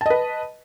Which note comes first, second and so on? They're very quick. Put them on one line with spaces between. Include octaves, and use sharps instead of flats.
A5 D#5 B4